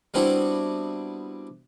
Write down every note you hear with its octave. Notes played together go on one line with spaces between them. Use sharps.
G3 B3 C4 D4 E4 F#4